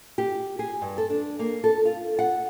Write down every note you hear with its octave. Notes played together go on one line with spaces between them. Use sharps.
G4
G#4
G2
A4
D4
A#3
A4
F4
F#5